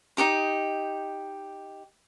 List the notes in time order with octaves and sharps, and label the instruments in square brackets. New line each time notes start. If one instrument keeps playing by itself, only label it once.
[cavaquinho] D#4 E4 G4 D#6